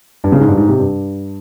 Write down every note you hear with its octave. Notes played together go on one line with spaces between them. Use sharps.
G2
C#3
G#2
G2
G#2
C3
G2